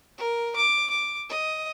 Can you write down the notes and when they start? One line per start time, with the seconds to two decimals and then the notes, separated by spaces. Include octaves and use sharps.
0.17 A#4
0.56 D6
0.89 D6
1.29 D#5